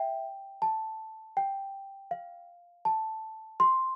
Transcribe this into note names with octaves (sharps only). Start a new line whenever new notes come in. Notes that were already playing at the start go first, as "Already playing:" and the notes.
Already playing: E5 G5
A5
G5
F5
A5
C6